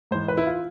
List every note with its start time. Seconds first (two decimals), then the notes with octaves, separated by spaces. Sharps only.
0.11 G#2 E3 C5
0.28 B4
0.37 E4
0.47 F4